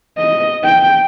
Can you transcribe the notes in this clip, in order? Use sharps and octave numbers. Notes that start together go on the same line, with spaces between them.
D#5
G5